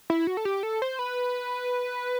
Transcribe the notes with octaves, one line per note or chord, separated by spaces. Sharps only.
E4
F#4
A4
G4
A4
C5
B4